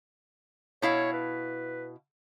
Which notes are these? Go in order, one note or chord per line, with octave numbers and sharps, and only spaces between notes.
B2 E4 C#5 F5
B4